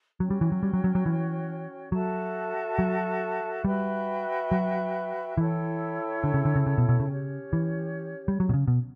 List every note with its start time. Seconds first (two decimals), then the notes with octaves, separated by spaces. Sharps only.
0.20 F#3 C#4 F#4 C#5 G5
0.30 G3
0.41 E3
0.52 F#3
0.63 G3
0.74 F#3
0.84 F#3
0.95 F#3
1.06 E3
1.92 F#3 F#4 A4 E5 A5
2.79 F#3
3.64 G3 F#4 B4 E5 G5
4.51 F#3
5.38 E3 E4 A4 C#5 G5
6.24 D3
6.34 C#3
6.45 D3
6.56 C#3
6.66 C#3
6.78 B2
6.89 B2
7.00 C#3
7.09 C#4 G4 C#5
7.53 E3
8.28 G3
8.40 F#3
8.49 B2
8.54 C#3
8.68 B2